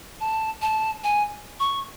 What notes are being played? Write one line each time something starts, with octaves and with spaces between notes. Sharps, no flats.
A5
A5
G#5
C#6